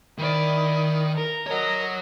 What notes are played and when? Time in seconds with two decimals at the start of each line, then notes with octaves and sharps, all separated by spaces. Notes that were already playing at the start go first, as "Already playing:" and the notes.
0.18 D#3 E4 D5
1.15 A#4
1.47 A#4 C#5 D#5 F#5